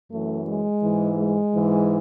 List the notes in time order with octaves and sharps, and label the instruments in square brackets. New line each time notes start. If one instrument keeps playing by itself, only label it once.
[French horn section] F#2 E3 A3
G#3
G#2 E3
G#3
G#2 E3